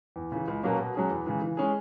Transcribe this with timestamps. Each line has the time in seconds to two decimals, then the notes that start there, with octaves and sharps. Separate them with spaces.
0.16 E2
0.32 C#3 E3
0.48 C#2
0.63 B2 F#3 A#3 C#4
0.79 B2
0.94 F#3 C#4 G#4
1.10 E2
1.26 C#3 E3 G#3
1.42 E3
1.57 G#3 C#4 G#4